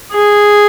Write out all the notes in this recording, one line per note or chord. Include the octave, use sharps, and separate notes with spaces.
G#4